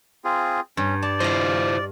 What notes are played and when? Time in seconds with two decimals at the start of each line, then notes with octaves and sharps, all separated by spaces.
0.24 C4 F4 G#4
0.77 G2 C#4
1.02 D5 A5
1.20 E4 F4 C5 D#5 F5